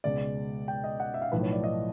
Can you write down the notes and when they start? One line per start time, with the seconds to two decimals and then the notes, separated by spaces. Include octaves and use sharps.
0.04 C#2 B2 G#3 D5
0.68 G5
0.84 D#5
1.00 F#5
1.14 E5
1.22 F5
1.32 B1 A2 F3 B4
1.42 C#5
1.53 D5
1.64 D#5